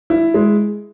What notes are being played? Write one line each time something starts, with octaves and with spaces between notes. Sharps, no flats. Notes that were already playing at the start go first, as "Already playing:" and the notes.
E4
G#3